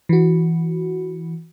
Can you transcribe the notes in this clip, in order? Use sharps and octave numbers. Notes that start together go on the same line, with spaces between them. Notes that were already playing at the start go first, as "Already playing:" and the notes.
E3 F#4